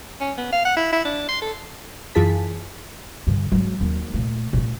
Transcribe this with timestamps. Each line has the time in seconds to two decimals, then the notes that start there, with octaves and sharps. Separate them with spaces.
0.20 C#4
0.37 B3
0.52 F5
0.65 F#5
0.76 E4
0.92 E4
1.05 D4
1.28 C6
1.41 A4
2.15 F#2 E3 F4 G#4 A5 B6
3.27 G2 D3
3.52 G#2 F#3
3.80 D#2 F#3
4.14 A#2 A3
4.53 A#2 A3